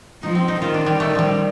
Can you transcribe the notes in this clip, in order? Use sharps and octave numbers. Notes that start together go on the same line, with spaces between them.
F3 D#4
C4
D#4
D#3 F4
D4
G3
D#3 A3
F3 G3